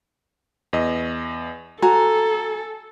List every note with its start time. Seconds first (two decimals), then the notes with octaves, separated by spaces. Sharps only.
0.73 E2 D#5
1.82 F#4 A4 G#5 A#5